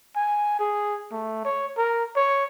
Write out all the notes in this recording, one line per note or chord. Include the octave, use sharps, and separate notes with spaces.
G#5
G#4
A3
C#5
A#4
C#5